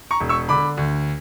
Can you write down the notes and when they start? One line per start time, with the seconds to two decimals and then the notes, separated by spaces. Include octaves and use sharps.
0.11 A#5 C#6
0.20 E1
0.29 C#6 E6
0.49 D3 B5 D6
0.77 D2